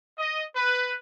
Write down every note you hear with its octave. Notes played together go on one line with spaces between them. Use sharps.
D#5
B4